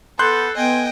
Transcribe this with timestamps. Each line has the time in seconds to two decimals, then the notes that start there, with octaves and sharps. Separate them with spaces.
0.19 B3 A4 C6 F#6 G6
0.57 B3 D#5 G5 G#5